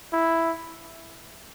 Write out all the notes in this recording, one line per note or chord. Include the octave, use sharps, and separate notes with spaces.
E4